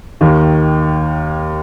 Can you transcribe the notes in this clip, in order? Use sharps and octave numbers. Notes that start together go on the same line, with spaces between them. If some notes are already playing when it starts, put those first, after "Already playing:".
D#2 D#3